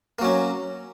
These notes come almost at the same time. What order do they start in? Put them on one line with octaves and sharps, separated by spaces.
A#3 F#3 C#4